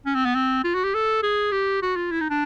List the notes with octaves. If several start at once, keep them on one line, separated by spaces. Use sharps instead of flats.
C#4
C4
B3
C4
F4
F#4
G4
A4
G#4
G4
F#4
F4
E4
D#4
D4